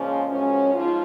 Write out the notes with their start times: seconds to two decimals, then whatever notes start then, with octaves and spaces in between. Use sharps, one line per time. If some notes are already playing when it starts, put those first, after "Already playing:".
Already playing: A#2 C#3 F3 G#3 C#4
0.29 F#2 C#3 F3 G#3 C#4
0.74 G#2 F3 F4